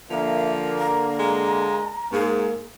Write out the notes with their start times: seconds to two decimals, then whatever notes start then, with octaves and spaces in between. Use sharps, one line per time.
0.10 D3 F3 A#3 E5
0.79 A#5
1.19 G#3
2.12 G#2 A#3 G#4